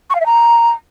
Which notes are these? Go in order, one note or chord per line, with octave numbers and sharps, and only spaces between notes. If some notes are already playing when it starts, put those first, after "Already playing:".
C#6
F5
E5
A#5